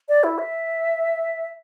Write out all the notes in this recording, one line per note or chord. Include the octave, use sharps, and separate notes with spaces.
D5
E4
E5